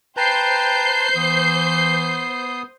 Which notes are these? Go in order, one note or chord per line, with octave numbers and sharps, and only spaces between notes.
B4 C5 G5 A5 A#5 G6 C7
E3 B3 D#6